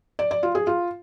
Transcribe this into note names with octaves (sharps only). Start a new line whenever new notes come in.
D5
D5
F4
G#4
F4